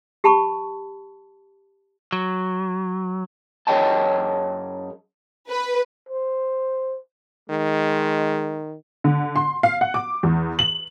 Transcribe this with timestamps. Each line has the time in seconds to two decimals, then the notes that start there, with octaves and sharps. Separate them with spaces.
0.24 G4 A5 B5 C#6
2.12 F#3
3.67 F#2 G#4 C#5 D#5 G5 A5
5.50 B4
6.09 C5
7.50 D#3 G#3
9.04 D3
9.36 C6
9.63 F5
9.81 F#5
9.94 D6
10.23 E2
10.59 F#7